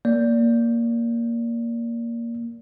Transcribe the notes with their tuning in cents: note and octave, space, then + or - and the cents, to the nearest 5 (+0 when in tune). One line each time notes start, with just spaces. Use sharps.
A#3 +0 D5 -20